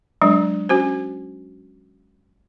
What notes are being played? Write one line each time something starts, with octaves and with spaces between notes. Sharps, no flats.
F#3 G#3 D4
C#4 F#4 C5